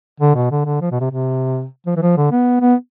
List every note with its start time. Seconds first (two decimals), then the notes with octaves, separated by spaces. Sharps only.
0.20 D3
0.35 B2
0.51 D3
0.65 D3
0.81 F3
0.91 B2
1.00 C3
1.10 C3
1.87 F3
1.96 E3
2.02 F3
2.17 D3
2.32 B3
2.61 B3